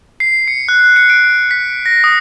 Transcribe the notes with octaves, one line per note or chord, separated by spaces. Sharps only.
C7
C#7
F#6
C#7
D7
B6
A#6
D#6